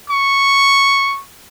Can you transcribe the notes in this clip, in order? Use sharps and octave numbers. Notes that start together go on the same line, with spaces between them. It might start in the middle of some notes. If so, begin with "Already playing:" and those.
C#6